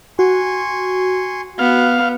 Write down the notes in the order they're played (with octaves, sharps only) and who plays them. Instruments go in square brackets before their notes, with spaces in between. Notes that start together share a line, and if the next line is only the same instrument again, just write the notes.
[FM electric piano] F#4 [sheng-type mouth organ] G#5 C6 C#6
[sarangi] B3 [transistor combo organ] F5